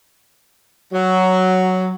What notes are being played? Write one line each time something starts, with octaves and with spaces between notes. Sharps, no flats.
F#3